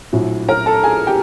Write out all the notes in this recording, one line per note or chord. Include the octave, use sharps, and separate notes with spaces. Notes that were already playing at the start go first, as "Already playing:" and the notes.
A#1 A2 F#3
A#4 A#5
A4 A5
G#4 G#5
G4 G5